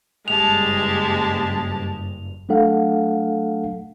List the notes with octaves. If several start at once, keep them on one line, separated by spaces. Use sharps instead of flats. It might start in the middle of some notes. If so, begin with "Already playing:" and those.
F#1 G2 G#3 G4 A5 F7
F#3 A3 D4 A4 F5 F#5